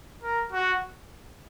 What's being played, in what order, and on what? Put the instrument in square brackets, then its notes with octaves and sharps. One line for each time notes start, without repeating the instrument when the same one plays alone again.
[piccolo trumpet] A#4
F#4